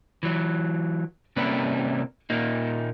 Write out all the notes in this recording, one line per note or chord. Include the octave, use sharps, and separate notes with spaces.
E3 F#3
C3 G3 A#3 C#4 E4 B4
A#2 A#3 D#4